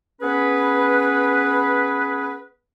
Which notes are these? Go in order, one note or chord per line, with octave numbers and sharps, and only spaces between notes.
B3 C#4 G#4 B4